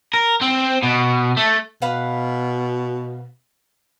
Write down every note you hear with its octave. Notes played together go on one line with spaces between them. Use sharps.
A#4
C4
B2
A3
B2 B4 F5 F#5